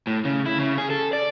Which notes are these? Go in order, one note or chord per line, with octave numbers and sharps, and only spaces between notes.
A2
C#3
E4
C#3
G#4
A4
D5